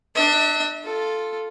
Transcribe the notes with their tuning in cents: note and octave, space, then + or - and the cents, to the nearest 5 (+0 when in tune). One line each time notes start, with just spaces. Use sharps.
D4 +25 E5 -35
F4 +0 A4 +0